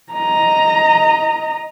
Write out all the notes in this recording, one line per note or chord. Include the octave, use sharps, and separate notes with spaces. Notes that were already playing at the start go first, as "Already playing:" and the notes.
D#5 A#5